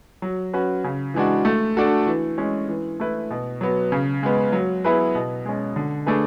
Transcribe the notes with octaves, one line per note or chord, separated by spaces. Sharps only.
F#3
C#4 F#4 B4
C#3
E3 G#3 D4 F#4
A3
D4 F#4 A4
E3
G#3 C#4
E3
A3 E4 B4
B2
F#3 B3
C#3
G#3 B3
F#3
B3 E4 G#4 B4
B2
G#3 C#4
D3
A3 D4 G#4 B4